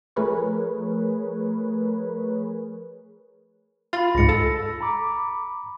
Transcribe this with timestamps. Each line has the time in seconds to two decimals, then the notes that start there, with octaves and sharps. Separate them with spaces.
0.16 F3 A3 G#4 A#4 B4 C#5
3.93 F4 B5 A6
4.15 C#2 G#2 A#6 C#7
4.29 A4 E6
4.81 A#5 B5 D6